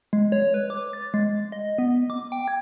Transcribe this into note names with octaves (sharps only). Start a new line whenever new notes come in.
G#3
C#5
B4
D6
A6
G#3
D#5
B3
D6
G5
G#6